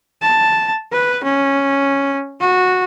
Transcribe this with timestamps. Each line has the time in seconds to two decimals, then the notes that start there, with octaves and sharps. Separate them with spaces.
0.22 A5
0.93 B4
1.24 C#4
2.40 F#4